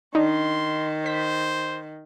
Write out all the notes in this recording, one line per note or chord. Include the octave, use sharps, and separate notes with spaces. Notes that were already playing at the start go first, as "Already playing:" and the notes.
D#3 D4 D#4 C6
C5 B6